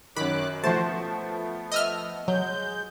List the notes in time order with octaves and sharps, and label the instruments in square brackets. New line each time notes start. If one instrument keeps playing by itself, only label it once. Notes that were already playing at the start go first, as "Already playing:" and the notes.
[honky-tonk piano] F#2 D#3 [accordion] F#3 D6 F#6 [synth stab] B5
[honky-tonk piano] F3 A3 [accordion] F#4 C5 [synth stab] A5
[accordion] B3
[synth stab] D#5 E5 F6
[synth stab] F#3 [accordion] G#3 G6